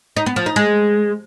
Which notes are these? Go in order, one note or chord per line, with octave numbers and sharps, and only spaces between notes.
D#4
B3
F3
D#4
G#3